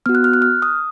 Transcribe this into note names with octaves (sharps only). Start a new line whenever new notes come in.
B3 F#4 F6
F#6
F6
F#6
F6
D#6